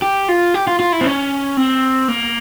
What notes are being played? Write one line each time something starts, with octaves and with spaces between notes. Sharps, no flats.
G4
F4
G4
F4
F4
E4
C4
C#4
C4
A#3